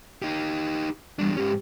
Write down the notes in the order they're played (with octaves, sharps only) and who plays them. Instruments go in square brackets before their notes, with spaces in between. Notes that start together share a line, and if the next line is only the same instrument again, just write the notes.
[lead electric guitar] D#4 G4
[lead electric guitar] E2 D4 [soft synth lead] G3
[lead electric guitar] G#2 C#4 [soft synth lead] G4